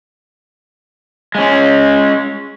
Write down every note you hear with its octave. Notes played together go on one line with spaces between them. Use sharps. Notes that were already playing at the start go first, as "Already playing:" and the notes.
G#3 C#4